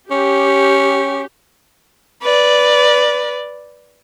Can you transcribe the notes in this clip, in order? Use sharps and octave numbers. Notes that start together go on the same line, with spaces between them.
C#4 G4
B4 D5